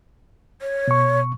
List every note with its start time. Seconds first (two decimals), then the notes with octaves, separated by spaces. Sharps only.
0.62 C#5
0.88 B2 C#6